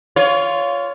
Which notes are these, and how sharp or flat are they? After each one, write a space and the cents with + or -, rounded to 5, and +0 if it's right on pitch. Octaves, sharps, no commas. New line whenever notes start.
F4 +0 C#5 +25